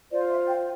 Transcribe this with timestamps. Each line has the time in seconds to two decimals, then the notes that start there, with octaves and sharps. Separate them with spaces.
0.11 F4 C5 D5
0.30 E5
0.47 G5